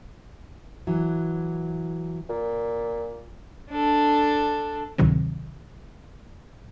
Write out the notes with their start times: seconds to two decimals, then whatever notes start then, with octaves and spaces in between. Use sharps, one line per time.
0.87 E3 F#3
2.29 A#2
3.70 D4 A4
4.98 D2 A2 C3 D#3 F#3 C4